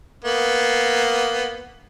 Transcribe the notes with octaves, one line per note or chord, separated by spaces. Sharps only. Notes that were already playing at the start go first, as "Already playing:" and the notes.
A#3 B3